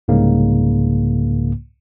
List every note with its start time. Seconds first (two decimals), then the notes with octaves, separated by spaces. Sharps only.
0.08 C2 G#2 C#3 A#3